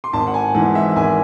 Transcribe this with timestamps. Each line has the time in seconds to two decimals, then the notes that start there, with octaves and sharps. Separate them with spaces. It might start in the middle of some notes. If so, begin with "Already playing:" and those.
0.04 C6
0.13 G#1 A5
0.27 F#5
0.34 G#5
0.55 G#2 E3 F#5
0.75 E5
0.96 G#1 G#5